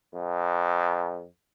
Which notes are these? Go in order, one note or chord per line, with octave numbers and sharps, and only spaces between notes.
F2